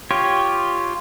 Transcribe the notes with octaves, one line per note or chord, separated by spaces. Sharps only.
F4 G4 C#5